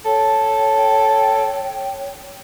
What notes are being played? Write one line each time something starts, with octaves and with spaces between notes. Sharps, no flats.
A4 C#5 G5